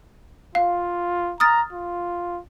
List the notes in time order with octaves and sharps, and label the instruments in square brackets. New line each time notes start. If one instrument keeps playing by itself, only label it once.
[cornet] F4 [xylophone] F5
[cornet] A#5 [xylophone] D#6 F6 A6
[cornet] F4